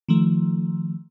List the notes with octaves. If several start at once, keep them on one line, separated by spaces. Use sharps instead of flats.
D#3 F3 A3